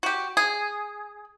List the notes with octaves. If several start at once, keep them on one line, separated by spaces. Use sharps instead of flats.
F#4 G4
G#4